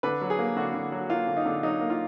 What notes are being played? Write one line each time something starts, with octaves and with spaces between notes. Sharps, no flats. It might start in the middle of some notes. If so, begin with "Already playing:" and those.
D3 B4
F#3
G#4
A#3
D3 F#4
D3
F#3
A#3 F4
D3
D#4
D3
F#3 D#4
A#3
F4